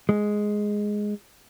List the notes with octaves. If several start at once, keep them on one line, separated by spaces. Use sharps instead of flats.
G#3